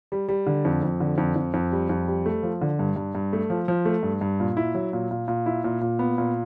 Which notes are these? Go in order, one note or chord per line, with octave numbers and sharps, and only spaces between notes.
G3
G3
D3
F2
F2
D3
F2
F2
F2
G3
F2
G3
A3
F3
D3
G2
G2
G2
A3
F3
F3
A3
G2
G2
A#2
E4
F#3
A#2
A#2
A#2
E4
A#2
A#2
B3
A#2